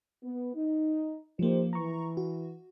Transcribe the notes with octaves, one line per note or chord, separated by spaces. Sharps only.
B3
D#4
F3 A#3 D#4 G4 C5
E3 A#5 C#6
F#4